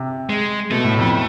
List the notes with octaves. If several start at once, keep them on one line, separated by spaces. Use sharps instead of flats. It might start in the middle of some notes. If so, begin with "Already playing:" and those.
Already playing: C3
G#3
B2 A3
A2
F2